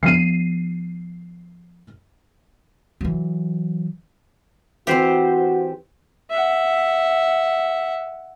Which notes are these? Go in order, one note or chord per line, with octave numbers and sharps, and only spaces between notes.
F3 B3 C7 D#7
E3 F#3
E3 C4 F#4 G4 C5
E5 F#5